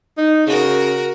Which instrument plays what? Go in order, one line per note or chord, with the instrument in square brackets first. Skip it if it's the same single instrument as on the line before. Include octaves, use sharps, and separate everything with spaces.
[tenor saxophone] D#4
[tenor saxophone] C#3 [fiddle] F#4 A#4